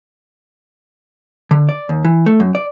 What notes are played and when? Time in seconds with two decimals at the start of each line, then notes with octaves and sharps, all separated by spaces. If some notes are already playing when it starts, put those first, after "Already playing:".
1.51 D3
1.69 D5
1.89 D#2
2.05 E3
2.26 A3
2.40 F#2
2.55 D5